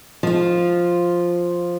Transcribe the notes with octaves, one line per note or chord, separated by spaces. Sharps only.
F3 F4